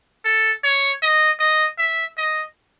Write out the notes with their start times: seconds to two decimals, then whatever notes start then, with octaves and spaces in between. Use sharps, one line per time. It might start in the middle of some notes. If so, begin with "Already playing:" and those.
0.25 A4
0.64 C#5
1.03 D#5
1.40 D#5
1.79 E5
2.17 D#5